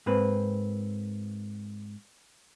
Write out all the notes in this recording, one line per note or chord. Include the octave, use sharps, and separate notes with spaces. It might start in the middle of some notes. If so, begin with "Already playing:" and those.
G#2 A#3 C4 B4